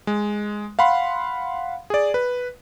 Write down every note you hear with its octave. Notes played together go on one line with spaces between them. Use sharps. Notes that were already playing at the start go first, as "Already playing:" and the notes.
G#3
F5 F#5 B5 C6
G#4 D5
B4